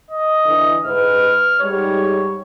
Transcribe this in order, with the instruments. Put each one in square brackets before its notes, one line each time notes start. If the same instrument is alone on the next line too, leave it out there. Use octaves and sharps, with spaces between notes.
[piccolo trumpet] D#5
[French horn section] D3 E3
[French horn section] G#2 B4 [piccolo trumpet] F6
[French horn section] G#2 G3 [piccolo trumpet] C#5